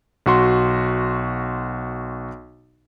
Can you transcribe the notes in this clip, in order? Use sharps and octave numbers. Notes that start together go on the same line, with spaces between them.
B1 F#4 C6